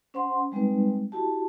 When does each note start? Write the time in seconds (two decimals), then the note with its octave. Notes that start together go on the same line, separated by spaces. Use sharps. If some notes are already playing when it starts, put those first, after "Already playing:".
0.14 C#4 C5 F#5 C6
0.52 G3 G#3 C4 D#4 B4
1.12 E4 F#4 G4 A5